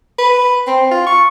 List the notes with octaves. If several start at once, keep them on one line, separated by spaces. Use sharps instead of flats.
B4
C4
F4
C#6